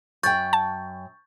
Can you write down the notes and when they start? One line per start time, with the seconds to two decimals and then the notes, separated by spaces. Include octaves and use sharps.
0.23 F#2 G5 C#6 G6 A6
0.53 A5